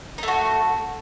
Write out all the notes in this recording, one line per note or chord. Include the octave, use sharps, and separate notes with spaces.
A3 D#4 F#4